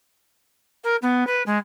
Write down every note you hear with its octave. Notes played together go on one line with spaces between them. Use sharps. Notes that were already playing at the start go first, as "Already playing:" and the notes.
A#4
B3
B4
G#3